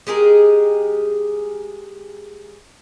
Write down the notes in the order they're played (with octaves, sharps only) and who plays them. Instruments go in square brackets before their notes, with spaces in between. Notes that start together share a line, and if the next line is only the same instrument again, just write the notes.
[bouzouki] G#3 G4 G#4 A#4